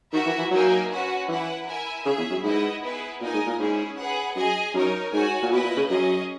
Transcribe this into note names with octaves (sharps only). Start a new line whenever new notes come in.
D#3 F#4 A#4 E5
E3
E3
F#3 A#3 D#4 A#4 E5 G#5
C#4 F#4 B4 F#5
E3 E4 B4 F#5
E4 A#4 E5 G#5
C#3 G#4 C#5 E5
E2
F#2
G#2 E4 B4 D#5 F#5
B3 E4 G#4 B4
A#2 D#4 A#4 D#5 G#5
G#2
A#2
G#2 C#4 E4 G#4
G#4 B4 F#5
F#2 G#4 D#5 G#5
F#2 D#4 A#4 C#5
G#2 F#4 C#5 G#5
A#2
B2 E4 B4 D#5
A#2
C#3
F#2 C#4 G#4 D#5